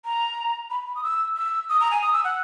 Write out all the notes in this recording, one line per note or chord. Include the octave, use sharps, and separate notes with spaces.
A#5
B5
B5
D#6
E6
E6
D#6
A#5
G#5
D#6
E6
F#5